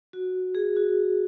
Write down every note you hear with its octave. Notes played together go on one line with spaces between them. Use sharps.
F#4
G#4
F#4